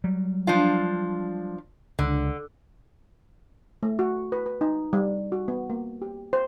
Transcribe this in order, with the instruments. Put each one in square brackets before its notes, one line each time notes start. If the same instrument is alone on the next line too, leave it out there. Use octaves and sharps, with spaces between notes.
[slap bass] F#3 G3
[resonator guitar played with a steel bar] F3 D4 F4
[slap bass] C#2 [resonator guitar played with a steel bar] D3
[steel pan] A3
F#4
B4
B4
D#4
G3
F#4
B3
A#3
G4
C5